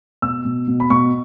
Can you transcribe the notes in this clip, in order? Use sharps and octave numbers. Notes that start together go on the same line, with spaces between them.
B2 E6
B2
B2
B5
B2 C#6